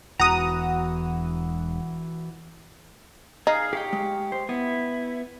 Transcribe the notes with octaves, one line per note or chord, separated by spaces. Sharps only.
E1 E3 F#4 F#5 A#5 D#6
D#4 G#4 F5
G4 G#4 C#5 F5 G5
G#3
C5
B3 E4